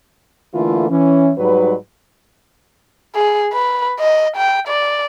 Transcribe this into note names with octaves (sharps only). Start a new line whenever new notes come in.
D3 E3 A3 A#3 E4 F4
E3 C#4
G#2 F#3 G3 D#4 B4
G#4
B4
D#5
G5
D5